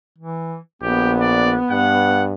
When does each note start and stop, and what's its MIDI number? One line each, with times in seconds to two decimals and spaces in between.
0.19 0.58 52
0.82 1.56 34
0.82 2.34 59
0.82 1.12 67
1.21 1.54 74
1.71 2.34 43
1.71 2.24 78